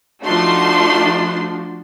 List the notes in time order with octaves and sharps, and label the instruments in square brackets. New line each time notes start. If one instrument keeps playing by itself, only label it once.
[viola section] F3 D4 F#4 [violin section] A3 D#4 C6